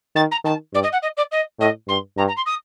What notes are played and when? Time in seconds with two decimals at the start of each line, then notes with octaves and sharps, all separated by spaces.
0.15 D#3 A6
0.31 A#5
0.45 D#3 A5
0.74 G2 D5
0.83 D#5
0.92 F#5
1.02 D#5
1.17 D5
1.31 D#5
1.59 A2 D#5
1.88 G2 C6
2.17 G2 A#5
2.28 A#5
2.36 C6
2.46 D#6